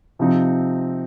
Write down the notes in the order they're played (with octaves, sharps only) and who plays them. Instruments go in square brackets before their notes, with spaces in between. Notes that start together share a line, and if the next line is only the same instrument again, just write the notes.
[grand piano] C3 F3 C4 D#4